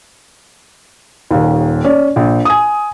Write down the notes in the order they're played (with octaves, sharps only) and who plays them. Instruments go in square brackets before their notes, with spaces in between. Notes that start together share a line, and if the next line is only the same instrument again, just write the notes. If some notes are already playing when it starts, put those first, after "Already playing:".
[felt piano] D#1 D#2
C#4 D5
A#1
G#5 D#6